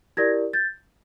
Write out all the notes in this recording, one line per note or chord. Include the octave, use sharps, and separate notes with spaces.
E4 G4 A#4 D5 G#6 A#6
G6 A6